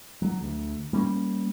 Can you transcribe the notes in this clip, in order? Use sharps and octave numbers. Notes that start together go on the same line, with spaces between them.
F#3
D2
G3 A#3 C#4